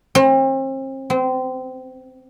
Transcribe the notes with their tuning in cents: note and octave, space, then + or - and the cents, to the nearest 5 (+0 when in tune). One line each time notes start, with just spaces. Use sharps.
C4 +40
C4 -25